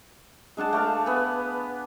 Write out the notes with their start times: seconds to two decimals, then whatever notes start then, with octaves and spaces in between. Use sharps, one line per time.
0.57 G#3 D4 F#5 A5
0.73 A3 D5 F5
1.06 B3 B4 F#5 G#5